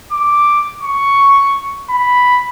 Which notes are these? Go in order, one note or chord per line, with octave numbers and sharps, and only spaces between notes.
D6
C#6
B5